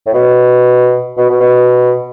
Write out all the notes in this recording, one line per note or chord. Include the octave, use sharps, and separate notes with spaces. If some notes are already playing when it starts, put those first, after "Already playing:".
A2
B2
B2
B2
B2